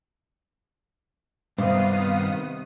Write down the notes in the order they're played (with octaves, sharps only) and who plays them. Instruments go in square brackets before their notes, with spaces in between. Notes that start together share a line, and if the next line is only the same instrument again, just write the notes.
[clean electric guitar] G2 [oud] C3 [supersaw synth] D#3 B3 D#6 [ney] F5